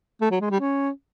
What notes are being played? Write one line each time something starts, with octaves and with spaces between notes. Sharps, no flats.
A3
F#3
G#3
G3
C#4